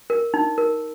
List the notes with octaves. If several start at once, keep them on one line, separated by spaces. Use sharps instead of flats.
A#4
D#4
A#4